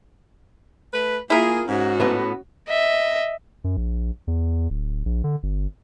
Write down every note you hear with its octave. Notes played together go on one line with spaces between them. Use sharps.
A3 B4
A#3 E4 F4 G#4 A#4
G#2 C#4 F#4
A2 B3 B4
D#5 E5
F#2
A#1
E2
D1
A#1
D3
G1